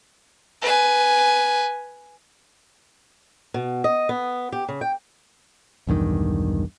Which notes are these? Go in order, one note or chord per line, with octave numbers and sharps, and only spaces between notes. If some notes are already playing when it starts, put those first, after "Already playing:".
B4 G#5
B2
D#5
B3
G4
C#3
G5
B1 E2 G2 D#3